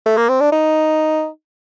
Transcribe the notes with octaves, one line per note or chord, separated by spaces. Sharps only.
A3
A#3
C4
D4
D#4